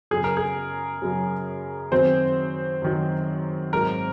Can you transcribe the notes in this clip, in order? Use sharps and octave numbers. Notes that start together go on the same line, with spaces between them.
F#2 C#3 F#3 G#4
A#4
G#4
F#2 C#3 F#3
F#2 D#3 F#3 C4 C5
F#2 D#3 F#3
G#2 F#3 A#4